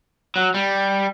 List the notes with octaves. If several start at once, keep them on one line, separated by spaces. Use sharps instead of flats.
F#3
G3